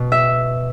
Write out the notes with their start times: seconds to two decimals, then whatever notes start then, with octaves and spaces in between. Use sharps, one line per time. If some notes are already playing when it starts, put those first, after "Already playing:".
Already playing: B2
0.12 E5